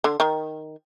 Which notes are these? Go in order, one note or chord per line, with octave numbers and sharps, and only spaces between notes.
D3
D#3